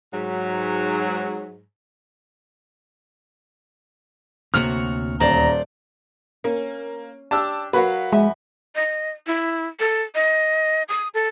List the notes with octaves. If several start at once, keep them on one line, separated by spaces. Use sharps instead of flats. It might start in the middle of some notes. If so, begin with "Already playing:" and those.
G#2 F#3
D2 C3 A#3 F#4 C#5 F6
D#1 C5 D5 A#5
A#3 C#4
D4 G4 A5 E6
F#3 F#4 A#4 B4 F5
F2 G#3 E5 G#5
D#5
E4
A4
D#5
D#6
A4